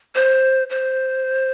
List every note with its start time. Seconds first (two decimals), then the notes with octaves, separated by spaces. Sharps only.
0.15 C5
0.70 C5